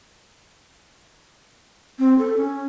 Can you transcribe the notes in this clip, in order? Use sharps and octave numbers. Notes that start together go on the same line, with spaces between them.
C4
A4
C#4